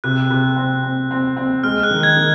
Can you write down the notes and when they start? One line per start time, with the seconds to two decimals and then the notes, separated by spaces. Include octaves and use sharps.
0.04 C3 F#6
0.30 C3
0.56 C4
0.83 C4
1.11 C4
1.37 C4
1.64 G#3 F6
1.83 F#6
1.91 D#3
2.03 G#6
2.17 D#3